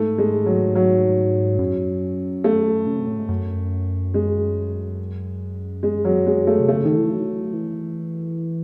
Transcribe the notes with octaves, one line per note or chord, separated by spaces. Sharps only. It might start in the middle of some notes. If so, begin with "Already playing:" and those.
Already playing: G#2 A3
G#3
F#3
F#3
F#2
A3
C#3
C3
A2
G#2
F#2
G#3
G#3
F#3
G#3
A3
C3
C#3 A3
D#3
E3
F#3
E3